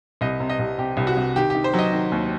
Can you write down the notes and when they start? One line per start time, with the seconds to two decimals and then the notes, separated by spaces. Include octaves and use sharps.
0.21 C2 D#5
0.40 C3
0.50 D#5
0.59 C2
0.78 C3 G4
0.97 C2
1.07 F#4
1.17 C2
1.36 D#3 G4
1.50 D#3 G4
1.64 C5
1.74 F#3 D#5
1.93 D#3
2.12 D#2